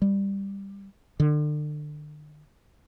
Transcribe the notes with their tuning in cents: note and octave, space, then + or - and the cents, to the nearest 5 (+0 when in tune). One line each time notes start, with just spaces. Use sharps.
G3 +10
D3 +35